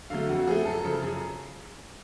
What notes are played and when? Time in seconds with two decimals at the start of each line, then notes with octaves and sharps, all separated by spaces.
0.10 D3 F#3 A3 F5
0.29 F2 F#4
0.39 F#4
0.47 F3 A3 G#4
0.65 F#2 A4
0.84 C#3 F3 A4
1.02 F#2 G#4